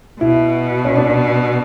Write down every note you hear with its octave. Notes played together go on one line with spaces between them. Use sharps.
B2 E4
C#4
D4